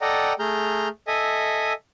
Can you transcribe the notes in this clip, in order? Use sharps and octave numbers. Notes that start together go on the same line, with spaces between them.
A4 D5 D#5 F#5 G5 A#5
A3 G#4 A#5 F6 G6
A4 D#5 E5 G#5